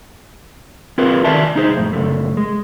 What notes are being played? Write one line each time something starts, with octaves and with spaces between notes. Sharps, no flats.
C4 F4 G#4 A#4 B4
D#3 F#4 D5 E5 G#5 A5
C2 D#4 G#4 C5
F2 A2
C#2 F#2 A3
G#3